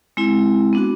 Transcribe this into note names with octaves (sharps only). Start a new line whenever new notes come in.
G#3 C4 E4
B3 D4 F#4